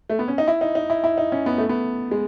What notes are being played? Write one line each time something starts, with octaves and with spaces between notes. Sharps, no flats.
A3
B3
C#4
D#4
E4
D#4
D#4
E4
E4
D#4
C#4
B3
A3
B3
G#3